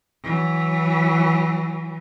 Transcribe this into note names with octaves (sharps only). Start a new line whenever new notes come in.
E3 F#3